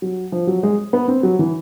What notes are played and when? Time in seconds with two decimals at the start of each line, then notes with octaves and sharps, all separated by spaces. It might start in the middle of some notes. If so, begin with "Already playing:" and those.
0.02 F#3
0.32 F3
0.47 F#3
0.63 G#3
0.93 B3
1.08 C4
1.23 F#3
1.39 E3